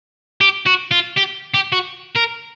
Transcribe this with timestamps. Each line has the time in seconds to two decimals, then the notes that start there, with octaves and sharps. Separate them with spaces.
0.41 G4
0.66 F#4
0.91 F4
1.17 G4
1.54 G4
1.73 F#4
2.16 A#4